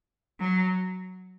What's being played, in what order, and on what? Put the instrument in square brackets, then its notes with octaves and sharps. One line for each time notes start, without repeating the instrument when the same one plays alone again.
[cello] F#3